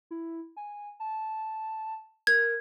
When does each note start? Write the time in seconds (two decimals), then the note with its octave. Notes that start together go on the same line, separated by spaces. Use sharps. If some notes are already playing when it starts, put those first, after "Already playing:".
0.11 E4
0.57 G#5
1.00 A5
2.27 A#4 G#6